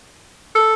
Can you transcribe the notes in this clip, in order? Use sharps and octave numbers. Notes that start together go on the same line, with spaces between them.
A4